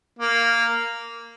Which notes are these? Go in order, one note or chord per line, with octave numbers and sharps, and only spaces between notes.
A#3